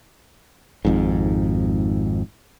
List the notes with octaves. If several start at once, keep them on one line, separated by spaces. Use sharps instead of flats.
G#1 F2 G#2